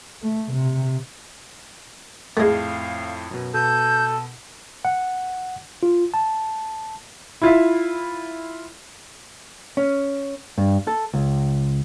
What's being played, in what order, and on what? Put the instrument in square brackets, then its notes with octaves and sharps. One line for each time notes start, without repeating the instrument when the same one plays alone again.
[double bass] A3
C3
[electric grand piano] F2 A2 [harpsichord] G#3 A3 [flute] F5
[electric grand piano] F#2 B2
[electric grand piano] B2 [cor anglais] A4 [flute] G6
[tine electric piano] F#5
F4
A5
[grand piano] E4 F4 E5
[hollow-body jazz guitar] C#4
G2
A4
C#2